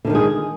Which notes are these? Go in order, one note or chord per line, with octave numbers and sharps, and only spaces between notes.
D3 D#3 F3 G#3 G#4